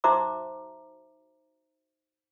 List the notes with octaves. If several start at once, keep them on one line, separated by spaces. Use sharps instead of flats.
D#4 F#4 C5 E5 A#5 D6